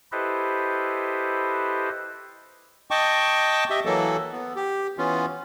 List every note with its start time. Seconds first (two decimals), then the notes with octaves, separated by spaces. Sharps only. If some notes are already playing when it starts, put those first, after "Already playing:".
0.12 E4 G4 A4 B4 C5 D#5
2.91 D#5 G5 A5 C#6 D6
3.70 G4 D#5 E5
3.85 E3 F#3 A#3 A4
4.32 B3
4.56 G4
4.98 E3 B3 C#4 F4